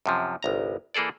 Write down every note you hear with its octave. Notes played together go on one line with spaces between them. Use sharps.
F#2 C3 F3
G1 C2 A#5
E3 A#3 G#4 A4 D5